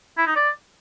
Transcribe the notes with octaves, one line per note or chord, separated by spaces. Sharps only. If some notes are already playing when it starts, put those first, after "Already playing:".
E4
D#4
D5